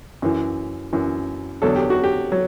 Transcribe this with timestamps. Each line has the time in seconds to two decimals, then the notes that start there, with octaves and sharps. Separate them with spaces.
0.22 F#2 E3
0.93 F#2 E3
1.62 E2 D3 F#3 A4
1.76 G4
1.90 F#4
2.04 G4
2.32 F#3